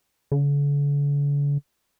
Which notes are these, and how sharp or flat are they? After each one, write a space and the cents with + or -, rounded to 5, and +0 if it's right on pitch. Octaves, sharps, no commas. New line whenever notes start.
D3 -45